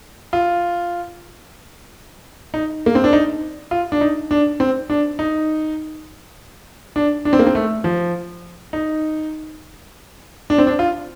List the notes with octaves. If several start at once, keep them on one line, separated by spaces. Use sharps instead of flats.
F4
D#4
A#3
C4
D4
D#4
F4
D4
D#4
D4
C4
D4
D#4
D4
D4
C4
A#3
C4
A3
F3
D#4
D4
C4
D4
F4